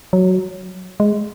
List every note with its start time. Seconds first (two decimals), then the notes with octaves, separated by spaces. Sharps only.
0.13 F#3
1.00 G#3